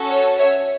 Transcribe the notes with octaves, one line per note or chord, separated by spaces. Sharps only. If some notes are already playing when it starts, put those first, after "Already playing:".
Already playing: C#4 F#4 A4
C#5
C#5 E5